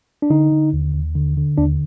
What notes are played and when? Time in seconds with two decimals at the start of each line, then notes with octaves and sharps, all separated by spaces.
0.22 D4
0.30 D3 D#4
0.52 D3
0.73 D#2
0.94 D#2
1.15 D3
1.37 D3
1.58 D#2 D4